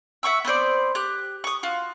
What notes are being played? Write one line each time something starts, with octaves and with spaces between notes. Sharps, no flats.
E5 F#5 C#6 E6
B3 C4 C5 D5
G4 F#6
C#6 D#6
F4 F#4